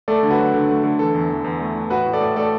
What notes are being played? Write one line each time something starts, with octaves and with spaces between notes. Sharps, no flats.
A3 A4 D5
D3
F#4 B4
F#3
D3
A3
D3
E3 A4
E2
E3
E2
A3
E3
A2 F#4 B4
A2
A4 D5
A2
A3 A4 D5